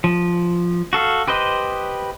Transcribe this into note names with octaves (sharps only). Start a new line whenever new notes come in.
F3
F#4 A4 F5
G4 B4 C5 D#5